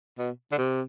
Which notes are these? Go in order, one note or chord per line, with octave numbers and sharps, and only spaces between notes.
B2
D3
C3